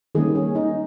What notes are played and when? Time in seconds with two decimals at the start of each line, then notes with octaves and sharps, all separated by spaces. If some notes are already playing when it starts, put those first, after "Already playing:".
0.15 D#3 G3 A#3 C#4 G#4
0.35 C#4
0.55 D#4